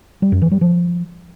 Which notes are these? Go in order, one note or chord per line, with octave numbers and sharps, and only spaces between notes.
G3
F#2
E3
G3
F3